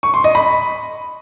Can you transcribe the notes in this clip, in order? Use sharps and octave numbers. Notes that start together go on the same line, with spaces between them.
C#6
C6
D#5
B5